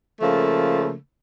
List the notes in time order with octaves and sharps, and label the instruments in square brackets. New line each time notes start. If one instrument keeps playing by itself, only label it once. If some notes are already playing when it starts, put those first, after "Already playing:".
[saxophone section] C#3 F3 A3 A#3